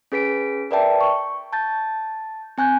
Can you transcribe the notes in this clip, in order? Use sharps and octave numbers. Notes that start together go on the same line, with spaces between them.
C#4 G#4 B4 B6 D7
A#4 B4 D5 E5 G5 A5
C#6
A5 G6 A6
C4 G#5 F#6 G6